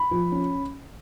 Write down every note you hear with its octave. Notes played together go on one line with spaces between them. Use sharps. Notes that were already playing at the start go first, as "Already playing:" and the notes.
Already playing: B5
F3
C#4